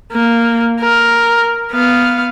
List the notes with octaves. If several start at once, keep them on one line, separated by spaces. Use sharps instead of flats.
A#3
A#4
B3 F5